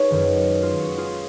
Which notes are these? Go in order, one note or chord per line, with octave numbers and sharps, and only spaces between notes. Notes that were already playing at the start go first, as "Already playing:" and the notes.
Already playing: D#4 G#4 B4 C#5
F#2 D#3 G#3
F4 G#4
F#4
F4 G#4